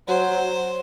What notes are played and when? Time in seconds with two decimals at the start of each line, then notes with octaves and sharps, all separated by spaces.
0.08 F#3 C5